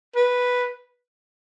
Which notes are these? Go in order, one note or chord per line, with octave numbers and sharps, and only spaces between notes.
B4